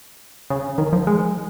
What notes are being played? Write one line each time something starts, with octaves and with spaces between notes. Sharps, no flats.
C#3
D#3
F3
G#3